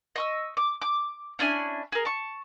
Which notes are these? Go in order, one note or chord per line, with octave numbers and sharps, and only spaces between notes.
D#5 C#6 E6
D6
D6
C#4 D4 E4 G#5
G#4 A#4
A5 C#6